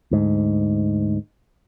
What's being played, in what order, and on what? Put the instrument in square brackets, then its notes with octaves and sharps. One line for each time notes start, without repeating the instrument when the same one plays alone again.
[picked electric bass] D2 G#2